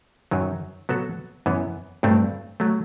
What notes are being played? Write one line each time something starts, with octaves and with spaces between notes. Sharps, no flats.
F#2 D#3 F#3
F#3 B3 F#4 A4
F#2 E3 B3
G2 F#3 A3 C4
F#3 A3